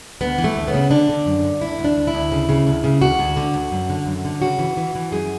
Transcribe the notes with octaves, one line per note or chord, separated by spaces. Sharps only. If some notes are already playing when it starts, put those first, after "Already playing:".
D2 B3
E3
A3
D2
B3
C#3
D3 D4
D3
F#2
D3
D2 E4
D2
D4
D2
E4
D2
C#3
C#3
D2
C#3
D2 F#4
D2
D3
D2
F#2
D3
F#2
D3
C#3 F#4
E3
E3
E3
F#2 G#4